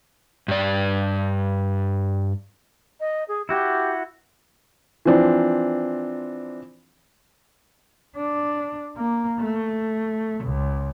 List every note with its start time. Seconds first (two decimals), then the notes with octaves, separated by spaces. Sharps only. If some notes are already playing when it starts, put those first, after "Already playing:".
0.48 G2 D5
3.00 D#5
3.28 G#4
3.49 E4 F#4 G4 G6
5.05 E3 F3 C4 D4
8.17 D4
8.97 A#3
9.40 A3
10.44 C#2